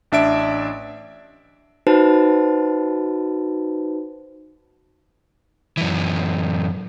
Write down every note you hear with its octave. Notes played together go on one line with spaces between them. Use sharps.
A1 D4 E5 D7
D#4 F#4 B4 C5 A5
F#2 E3